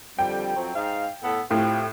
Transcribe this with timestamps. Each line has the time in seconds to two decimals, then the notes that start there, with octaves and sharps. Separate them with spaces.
0.19 F2 D3 G3 G5
0.56 F2 F#3 C4
0.75 G#2 D#4 F5
1.23 A2 B3 A4
1.51 A2 C4 F4 G4